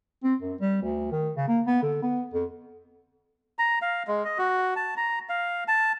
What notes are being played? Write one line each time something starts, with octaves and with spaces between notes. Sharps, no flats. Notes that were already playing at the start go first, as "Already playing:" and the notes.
C4
F#2
G3
D2
D#3
C#3
A#3
B3
D3
B3
F2
A#5
F5
G#3
D#5
F#4
A5
A#5
F5
A5